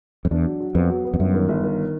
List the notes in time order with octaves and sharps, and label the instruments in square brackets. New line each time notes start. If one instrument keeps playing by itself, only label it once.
[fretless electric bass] F2
[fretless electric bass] E2 [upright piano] D4
[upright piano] F#3
F#3
[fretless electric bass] F2 [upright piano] B3
[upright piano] F#3
B3
[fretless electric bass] F2
[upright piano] G1 [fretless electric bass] F#2
[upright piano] D#3
G1
D#3